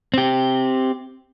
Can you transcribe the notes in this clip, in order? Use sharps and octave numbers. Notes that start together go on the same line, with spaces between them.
C4 G4